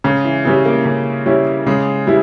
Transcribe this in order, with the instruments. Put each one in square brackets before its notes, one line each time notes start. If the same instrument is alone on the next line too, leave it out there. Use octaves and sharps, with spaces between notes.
[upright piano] C#3 [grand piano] G#3
[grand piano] E3
[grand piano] C#3 [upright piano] G3 C#4 E4
[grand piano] A#3
[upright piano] C#3
G3 C#4 E4
[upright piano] C#3 [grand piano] G#3
[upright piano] G3 E4